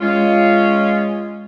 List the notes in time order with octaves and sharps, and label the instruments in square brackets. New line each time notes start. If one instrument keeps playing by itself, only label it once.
[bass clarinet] G#3 [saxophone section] C#4 F4